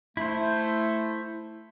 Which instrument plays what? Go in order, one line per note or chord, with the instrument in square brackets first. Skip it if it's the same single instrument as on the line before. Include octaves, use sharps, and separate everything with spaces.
[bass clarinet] A3 [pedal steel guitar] E4 C5